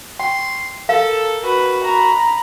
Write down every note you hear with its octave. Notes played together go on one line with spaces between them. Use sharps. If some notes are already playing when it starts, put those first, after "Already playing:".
G5 C6
A4 A#4 F5
F#4 B4
A#5 B5